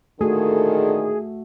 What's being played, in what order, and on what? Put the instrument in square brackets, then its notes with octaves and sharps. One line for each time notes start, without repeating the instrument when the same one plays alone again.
[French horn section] A#2 D3 D#3 [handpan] A3 F#4 [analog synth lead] G#4 [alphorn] A4